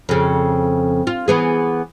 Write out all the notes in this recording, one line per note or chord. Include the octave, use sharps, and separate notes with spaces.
F2 C#3
F4
E3 B3 G#4